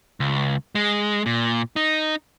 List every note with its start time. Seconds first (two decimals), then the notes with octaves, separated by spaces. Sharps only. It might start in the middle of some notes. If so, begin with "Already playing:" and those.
0.20 C#2
0.75 G#3
1.26 A#2
1.76 D#4